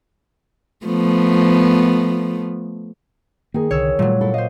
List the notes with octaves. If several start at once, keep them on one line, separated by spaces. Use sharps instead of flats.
F3 A3 B3
D#3 A#3 G#4
C2 D3 C#5 E6
A#2 F#3 G3 A3
E4 A4
C5 D#5 F5